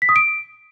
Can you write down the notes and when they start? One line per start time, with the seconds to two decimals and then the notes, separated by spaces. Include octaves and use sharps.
0.02 B6
0.09 D#6
0.16 D7